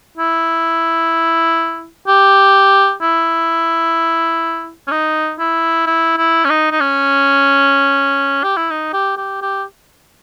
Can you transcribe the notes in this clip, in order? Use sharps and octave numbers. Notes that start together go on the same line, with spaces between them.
E4
G4
E4
C#4
D#4
E4
E4
E4
C#4
D#4
D#4
C#4
G4
E4
D#4
G4
G4
G4